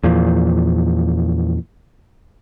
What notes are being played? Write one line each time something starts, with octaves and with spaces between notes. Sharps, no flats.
E2 A#2 F3